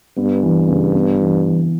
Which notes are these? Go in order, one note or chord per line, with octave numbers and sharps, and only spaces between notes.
G2 B3
E3
C#3
B3
E3
E3